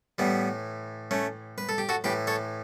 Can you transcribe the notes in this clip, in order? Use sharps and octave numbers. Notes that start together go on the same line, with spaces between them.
A2 E3 G3 B3
A3 C#4
B4
A4
G4
F#4 A4
A2 E3 G4 B4
A4 C#5